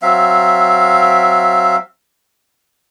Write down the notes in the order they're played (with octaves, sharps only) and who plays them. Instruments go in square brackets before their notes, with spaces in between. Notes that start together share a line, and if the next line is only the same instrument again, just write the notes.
[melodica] F#3 C4 E5 F5